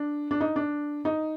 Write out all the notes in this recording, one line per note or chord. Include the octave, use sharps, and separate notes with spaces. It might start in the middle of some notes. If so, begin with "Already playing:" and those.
Already playing: D4
D4
D#4
D4
D#4